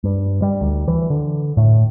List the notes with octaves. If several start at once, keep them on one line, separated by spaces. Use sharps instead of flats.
G2
G3
D2
E3
D3
A2